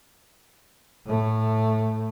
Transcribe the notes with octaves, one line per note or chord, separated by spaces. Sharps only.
A2 A3